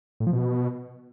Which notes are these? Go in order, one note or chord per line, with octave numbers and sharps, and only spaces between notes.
A2
F3
B2